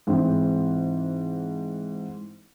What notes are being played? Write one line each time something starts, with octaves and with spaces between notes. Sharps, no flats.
G#2 E3 C4